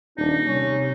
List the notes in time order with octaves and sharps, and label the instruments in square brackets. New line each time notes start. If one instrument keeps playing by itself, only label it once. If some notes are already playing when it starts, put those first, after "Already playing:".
[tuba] D#1 [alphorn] D4 [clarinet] D#4
[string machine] C3 [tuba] G3 [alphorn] C#4